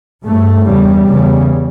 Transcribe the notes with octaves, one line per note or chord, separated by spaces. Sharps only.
G2 A3
E2 C#3 G3
E2 C#3